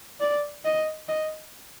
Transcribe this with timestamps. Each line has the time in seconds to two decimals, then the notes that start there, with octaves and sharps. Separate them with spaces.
0.20 D5
0.64 D#5
1.08 D#5